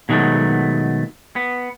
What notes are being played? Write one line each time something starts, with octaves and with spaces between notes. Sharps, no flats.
B2 D#3 F#3 G#3 A3
B3